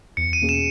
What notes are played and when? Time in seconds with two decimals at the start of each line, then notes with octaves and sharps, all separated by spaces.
0.17 E2 C#7
0.33 D#7
0.42 B2 A#3 C#4 G#4
0.49 E7